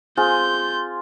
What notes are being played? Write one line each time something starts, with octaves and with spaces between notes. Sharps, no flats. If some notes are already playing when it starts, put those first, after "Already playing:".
C4 F4 G#4 G6